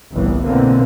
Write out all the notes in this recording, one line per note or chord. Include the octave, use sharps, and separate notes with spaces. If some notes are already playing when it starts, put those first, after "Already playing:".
G1 C2 A2 E3
B2 D3 E3 A#3 C4